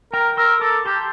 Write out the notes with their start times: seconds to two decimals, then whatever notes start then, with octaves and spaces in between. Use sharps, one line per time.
0.13 A#4 G5 A#5
0.37 A#4 C6 E6
0.61 A4 A#5 D6
0.86 G4 A5 C6